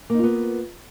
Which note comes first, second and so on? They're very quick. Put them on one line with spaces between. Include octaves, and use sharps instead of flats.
A#3 D#4 F4 B3